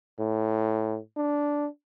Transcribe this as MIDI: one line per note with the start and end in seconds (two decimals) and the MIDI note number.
0.20 0.98 45
1.17 1.67 62